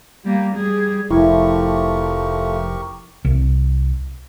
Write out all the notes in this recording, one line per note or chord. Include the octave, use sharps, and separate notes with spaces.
G3 A#3
G3 G#4
F1 F3 A3 E4 G4 A#4 C#6
C2